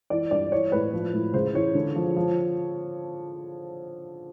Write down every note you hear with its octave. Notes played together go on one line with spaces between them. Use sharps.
E3 D5
G2 D5
E3 C#5
A2 B4
F3
A2
C#3 C5
E3 C#5
D3
F3
F3